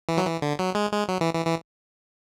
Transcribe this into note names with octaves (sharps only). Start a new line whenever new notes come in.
E3
F#3
E3
D3
F#3
G#3
G#3
F#3
E3
E3
E3